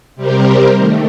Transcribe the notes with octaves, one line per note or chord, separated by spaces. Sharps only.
C3 G3 C4 G4 A#4
D#3 A3